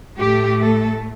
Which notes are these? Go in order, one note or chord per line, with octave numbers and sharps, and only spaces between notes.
A2 A3 G4
A4